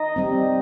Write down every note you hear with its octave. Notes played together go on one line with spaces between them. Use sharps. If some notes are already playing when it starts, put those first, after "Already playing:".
Already playing: D#4 D#5
G3 C4